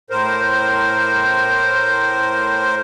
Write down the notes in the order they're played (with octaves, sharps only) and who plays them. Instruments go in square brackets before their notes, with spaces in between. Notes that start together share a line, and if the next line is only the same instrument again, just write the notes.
[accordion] A2 A#4 C5